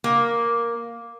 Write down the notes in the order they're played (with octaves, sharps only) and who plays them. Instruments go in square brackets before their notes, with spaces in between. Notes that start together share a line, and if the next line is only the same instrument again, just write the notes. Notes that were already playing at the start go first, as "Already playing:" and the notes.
[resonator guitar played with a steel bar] A#3